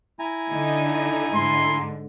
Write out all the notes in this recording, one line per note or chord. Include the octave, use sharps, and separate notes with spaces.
E4 G#5 A#5
D3 D#4
G#2 D3 C6